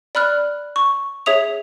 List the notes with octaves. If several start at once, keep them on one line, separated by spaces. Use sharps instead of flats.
D5 B5 F6 F#6
C#6
G#4 C#5 E5 D#6 F7